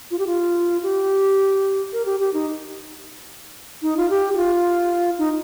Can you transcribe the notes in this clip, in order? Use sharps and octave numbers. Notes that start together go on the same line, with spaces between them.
F4
G4
F4
G4
A#4
G4
G4
D#4
D#4
F4
G4
G4
F4
D#4